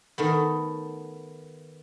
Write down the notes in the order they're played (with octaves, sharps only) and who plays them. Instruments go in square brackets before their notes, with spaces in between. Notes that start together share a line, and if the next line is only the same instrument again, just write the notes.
[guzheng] D#3 A3 B3